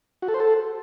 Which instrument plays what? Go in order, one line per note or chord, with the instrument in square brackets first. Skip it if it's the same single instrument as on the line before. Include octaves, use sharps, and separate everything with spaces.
[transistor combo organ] F#4
A4
C5
A4